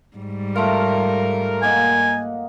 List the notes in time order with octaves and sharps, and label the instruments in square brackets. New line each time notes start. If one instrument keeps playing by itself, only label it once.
[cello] G#2 G3
[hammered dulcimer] A3 F4 [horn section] A#4
[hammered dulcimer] A#3 D#5 F#5 [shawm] G#5